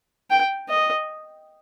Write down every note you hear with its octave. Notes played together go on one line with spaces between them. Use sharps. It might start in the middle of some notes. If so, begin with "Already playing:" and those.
G5
D#5